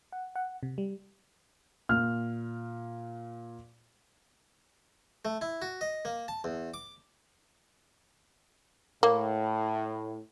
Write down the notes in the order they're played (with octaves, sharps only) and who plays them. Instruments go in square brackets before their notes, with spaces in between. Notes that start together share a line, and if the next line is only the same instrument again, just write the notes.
[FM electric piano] F#5
F#5
C3
G3
[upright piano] A#2 [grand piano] F6
[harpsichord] A3
E4
F#4
D#5
A#3
A5
E2
D6
[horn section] A2 [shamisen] A#3